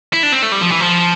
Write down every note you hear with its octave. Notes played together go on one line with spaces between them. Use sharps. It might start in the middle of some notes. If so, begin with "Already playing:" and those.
E4
D4
C4
A3
G3
F3
E3
F3